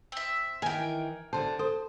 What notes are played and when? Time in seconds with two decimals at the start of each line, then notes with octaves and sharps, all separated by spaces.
0.12 C4 E5
0.62 D#3 E3 A#4 G5 G#5
1.33 D3 C5 A5
1.59 A4 C5